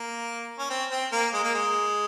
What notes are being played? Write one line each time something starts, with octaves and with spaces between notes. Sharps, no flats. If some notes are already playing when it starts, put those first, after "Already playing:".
Already playing: A#3
C#4
C4
C4
A#3
G#3
A#3
G#3